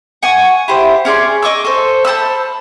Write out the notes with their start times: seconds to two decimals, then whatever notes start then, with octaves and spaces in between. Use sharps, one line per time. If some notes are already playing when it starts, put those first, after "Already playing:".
0.23 F#5 G#5 C#6
0.68 E4 G4 C5
1.05 C#4 G#4 D5 C6
1.42 D#5 C#6 D6 E6
1.65 A4 C5
2.05 C5 A5 B5 E6